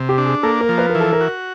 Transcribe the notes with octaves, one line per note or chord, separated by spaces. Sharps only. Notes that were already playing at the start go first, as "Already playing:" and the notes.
Already playing: C3
G4
D4
G#4
A#3 A4
A#4
F3
B4
A#4
E3
A4
A#4
F#4